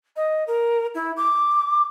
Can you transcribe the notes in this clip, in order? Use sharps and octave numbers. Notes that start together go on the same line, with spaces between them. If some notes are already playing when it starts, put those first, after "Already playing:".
D#5
A#4
E4
D6